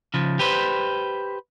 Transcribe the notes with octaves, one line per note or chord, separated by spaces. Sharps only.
C#3 F3
G4 B4 C5